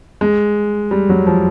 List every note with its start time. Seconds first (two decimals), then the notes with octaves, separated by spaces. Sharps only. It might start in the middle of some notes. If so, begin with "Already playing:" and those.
0.21 G#3
0.91 G3
1.09 F#3
1.27 F3